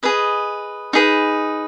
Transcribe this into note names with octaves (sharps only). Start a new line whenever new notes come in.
G#4 B4 D#5
D#4 G#4 B4